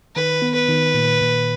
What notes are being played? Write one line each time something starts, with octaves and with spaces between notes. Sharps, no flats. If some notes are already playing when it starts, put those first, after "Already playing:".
D#3 B4
B3
B4
D#3
A#2
A#2